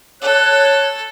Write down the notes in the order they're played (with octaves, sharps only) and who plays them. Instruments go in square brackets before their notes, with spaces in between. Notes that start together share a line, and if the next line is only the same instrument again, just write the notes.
[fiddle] A4 [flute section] C#5 F#6